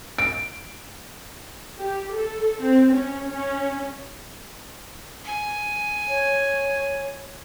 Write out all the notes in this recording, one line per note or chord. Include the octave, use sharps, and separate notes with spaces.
D7
G4
A4
C4
C#4
C#4
G#5
C#5